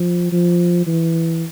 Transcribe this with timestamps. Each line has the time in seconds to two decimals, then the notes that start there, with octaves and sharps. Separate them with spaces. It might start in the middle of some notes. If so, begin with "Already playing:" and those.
Already playing: F3
0.32 F3
0.87 E3